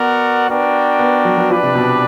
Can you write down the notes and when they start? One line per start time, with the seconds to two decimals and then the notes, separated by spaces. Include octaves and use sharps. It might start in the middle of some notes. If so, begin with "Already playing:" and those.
Already playing: B3 F#4 A#4 D5 F#5
0.48 B3 D4 F#4 A#4 D5 G5
0.99 B3
1.25 F#3
1.38 F#3
1.50 F3 D4 G4 B4 D5
1.63 C3
1.75 B2